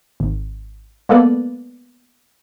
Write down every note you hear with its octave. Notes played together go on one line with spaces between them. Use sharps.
G#1
G#3 A#3 B3 A4 B4 D5